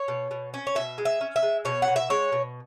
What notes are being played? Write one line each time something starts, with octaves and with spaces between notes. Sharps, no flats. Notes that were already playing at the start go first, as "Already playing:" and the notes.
Already playing: C#5
B2
B2
C#4
C#5
B2 E5
G#3
E5
C#4
E5
G#3
B2 C#5
F#5
B2
E5
G#3 C#5
B2